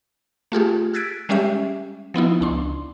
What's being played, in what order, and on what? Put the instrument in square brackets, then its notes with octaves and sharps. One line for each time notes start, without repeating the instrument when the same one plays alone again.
[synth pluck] A3 F4 G4 G#4
E6 F#6 G#6 A6 B6 D7
G3 G#3 C#4 G4 E5
F3 B3 D#4 E4
C#2 D4 C6